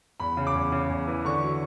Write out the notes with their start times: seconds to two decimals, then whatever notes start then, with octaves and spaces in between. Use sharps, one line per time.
0.20 E2 B5
0.37 C#3
0.47 D6
0.55 E2
0.72 C#3
0.90 E2
1.07 E3
1.25 D3 C#6
1.43 F#3